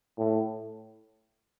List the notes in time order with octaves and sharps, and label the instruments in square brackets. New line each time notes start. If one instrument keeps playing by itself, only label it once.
[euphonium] A2